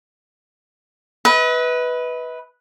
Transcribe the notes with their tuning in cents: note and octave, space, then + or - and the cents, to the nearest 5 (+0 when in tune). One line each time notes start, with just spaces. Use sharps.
B4 +0 D#5 +45